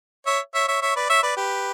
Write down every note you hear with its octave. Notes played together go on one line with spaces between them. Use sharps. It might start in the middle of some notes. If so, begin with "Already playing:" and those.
C#5 E5
C#5 E5
C#5 E5
C#5 E5
B4 D5
C#5 E5
B4 D5
G4 B4